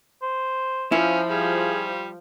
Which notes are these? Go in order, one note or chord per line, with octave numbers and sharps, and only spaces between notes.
C5
F3 C#4 E4
G3 G#4